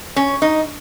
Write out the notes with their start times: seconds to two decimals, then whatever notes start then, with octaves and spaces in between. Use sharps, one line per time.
0.16 C#4
0.42 D#4